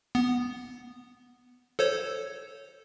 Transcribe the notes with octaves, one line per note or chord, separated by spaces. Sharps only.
B3
A4 C5 C#5